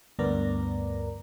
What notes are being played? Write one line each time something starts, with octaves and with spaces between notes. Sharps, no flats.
D2 G2 B3 A#4 D5 A#5